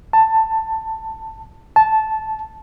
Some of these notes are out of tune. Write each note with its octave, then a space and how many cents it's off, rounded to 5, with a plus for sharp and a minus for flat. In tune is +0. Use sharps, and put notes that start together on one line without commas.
A5 +15
A5 -10